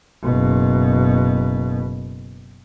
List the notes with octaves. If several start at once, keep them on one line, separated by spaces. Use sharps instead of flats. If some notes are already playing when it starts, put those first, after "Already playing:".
F#1 B2